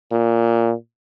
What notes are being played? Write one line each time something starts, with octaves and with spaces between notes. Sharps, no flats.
A#2